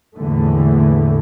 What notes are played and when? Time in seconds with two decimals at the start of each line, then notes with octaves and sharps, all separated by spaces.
0.16 A#1 E2 A2 D3 E3 A3